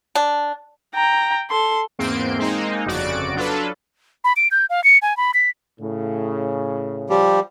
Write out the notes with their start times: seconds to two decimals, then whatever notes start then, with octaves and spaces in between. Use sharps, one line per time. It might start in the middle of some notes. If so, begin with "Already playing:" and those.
0.15 D4
0.95 G5 A#5
1.50 A4 C6
1.99 E2 G#2 A#3 C4 C6 D7
2.39 G#3 A#3 C4 D#4
2.86 G1 F2 C#3 F#4 D5 D7
3.36 F#3 D4 F4 A4 B4
4.24 B5
4.37 D7
4.51 G6
4.70 F5
4.84 C#7
5.02 G#5
5.17 B5
5.34 B6
5.80 A2 C#3
7.10 F3 G3 G4